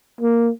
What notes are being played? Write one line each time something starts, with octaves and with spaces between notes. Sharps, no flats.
A#3